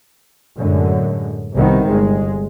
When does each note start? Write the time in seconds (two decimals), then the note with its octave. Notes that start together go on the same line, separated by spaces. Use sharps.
0.57 F#2 A2 D3 G#3
1.53 C2 C3 D#3 B3
1.87 G1 G#3